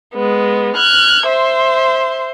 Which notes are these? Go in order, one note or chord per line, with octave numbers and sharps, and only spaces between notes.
G#3 B3
F6 F#6 G#6
C5 E5 C6